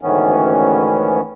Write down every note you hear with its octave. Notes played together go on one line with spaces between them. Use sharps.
D2 G#2 D#3 E3 B3 C#4